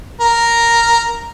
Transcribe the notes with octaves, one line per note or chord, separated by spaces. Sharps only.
A#4